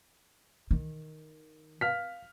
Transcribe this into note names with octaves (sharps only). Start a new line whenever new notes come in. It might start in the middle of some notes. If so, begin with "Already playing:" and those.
D#3
F5 F6 B6